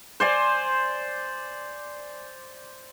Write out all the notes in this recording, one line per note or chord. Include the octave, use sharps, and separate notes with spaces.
C5 D5 G#5